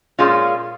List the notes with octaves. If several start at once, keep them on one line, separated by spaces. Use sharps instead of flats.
A#2 G#3 C#4 F4